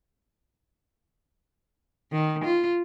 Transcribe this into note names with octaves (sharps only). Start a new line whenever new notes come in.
D#3
F4